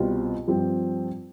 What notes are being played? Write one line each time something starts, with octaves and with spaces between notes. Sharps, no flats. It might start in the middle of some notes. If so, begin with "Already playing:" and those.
Already playing: C2 B2 G3 C4 F4
G2 F3 C4 G4